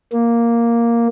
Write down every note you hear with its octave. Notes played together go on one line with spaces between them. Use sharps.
A#3